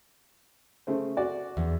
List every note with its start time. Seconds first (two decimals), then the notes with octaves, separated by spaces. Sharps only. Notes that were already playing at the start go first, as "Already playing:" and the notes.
0.87 C#3 A3 C5
1.17 F#4 D5
1.57 E2